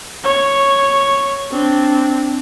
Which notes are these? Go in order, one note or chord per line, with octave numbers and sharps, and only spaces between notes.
C#5 C#6
C4 D4